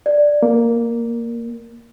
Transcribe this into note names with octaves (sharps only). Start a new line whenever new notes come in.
D5
A#3